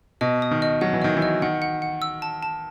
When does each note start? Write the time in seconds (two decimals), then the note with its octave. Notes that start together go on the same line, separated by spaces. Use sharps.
0.21 B2 D#5
0.42 D#6
0.51 D#3
0.62 D#5
0.81 F#3 F#5
0.93 E3
1.02 D#3 D#5
1.17 E3
1.22 D#5
1.42 D#3 F#5
1.62 F#5
1.82 F#5
2.02 E6
2.22 A5
2.43 A5